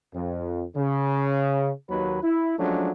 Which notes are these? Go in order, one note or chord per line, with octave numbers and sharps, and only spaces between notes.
F2
C#3
D#2 F#3 B4
E4
F3 F#3 G#3 A3 C#4 D4